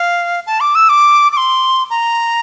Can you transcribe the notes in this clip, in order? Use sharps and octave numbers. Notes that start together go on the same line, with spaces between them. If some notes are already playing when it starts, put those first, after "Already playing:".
Already playing: F5
A5
D6
E6
D6
D6
C6
A#5